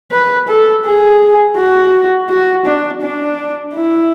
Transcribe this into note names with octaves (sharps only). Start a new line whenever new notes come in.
B4
A4
G#4
F#4
F#4
D4
D4
E4